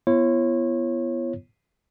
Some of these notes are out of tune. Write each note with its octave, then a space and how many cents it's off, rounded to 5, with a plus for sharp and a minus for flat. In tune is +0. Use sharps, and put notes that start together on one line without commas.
B3 +0 E4 +45 C#5 -25